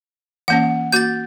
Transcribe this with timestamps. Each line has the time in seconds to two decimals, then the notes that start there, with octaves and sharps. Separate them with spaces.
0.48 E3 A#3 C#4 F#5
0.92 A#3 F#4 G6 A6